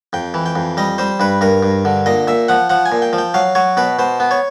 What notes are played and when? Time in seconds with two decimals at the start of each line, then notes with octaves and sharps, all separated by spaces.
0.13 F2 G5
0.34 E3
0.46 G5
0.56 F2
0.77 G3 D#5
0.98 G3 C5
1.20 G2 B4
1.41 G2 A#4
1.63 G2
1.85 D3
2.06 A#2 D#5
2.28 A#2 E5
2.48 F3 F#5
2.70 F3 F#5
2.86 G#5
2.92 A#2
3.02 G5
3.13 F3
3.18 G5
3.34 F#3 F5
3.55 F#3 C#5
3.77 B2 B4
3.99 B2 C5
4.20 B3
4.31 C#5